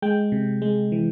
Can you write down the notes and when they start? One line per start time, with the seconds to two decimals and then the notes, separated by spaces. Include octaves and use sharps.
0.02 G#3 G5
0.32 C3
0.62 G#3
0.92 E3